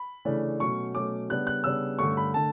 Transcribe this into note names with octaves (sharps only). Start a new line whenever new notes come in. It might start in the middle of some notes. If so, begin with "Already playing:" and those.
Already playing: B5
C#3 E3 A3 D4
B2 F#3 A3 C#4 C#6
B2 F#3 A3 C#4 D6
C#3 G3 B3 D4 F#6
F#6
C#3 G3 B3 D4 E6
G2 D3 A3 C#4 C#6
B5
D3 A3 A5